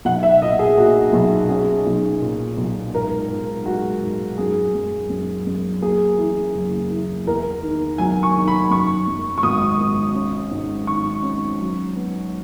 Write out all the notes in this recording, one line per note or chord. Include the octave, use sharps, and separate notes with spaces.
B1 F#5
E5
A#2 D#5
G#4
A#3 F#4
B1
C#4 G#4
B1
A#2
B1
G#2 A#4
G#2
G#3 F#4
G#2
F#2 G#4
F#2
F#2
F#2
A#3 G#4
E3
F#1
E3
E2 A#4
D#3
F#3 G#5
C#6
D#3
B5
F#2 C#6
F#2
C#6
G#1 D#6
G#1
C#4
G#2
D#3 C#6
C#4
F#3
B3